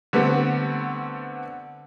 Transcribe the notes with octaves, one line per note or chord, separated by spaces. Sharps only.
D3 G3 A3 B3 C4